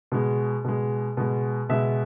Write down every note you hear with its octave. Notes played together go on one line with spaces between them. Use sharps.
B2 G#3
B2 G#3
B2 G#3
B2 G#3 E5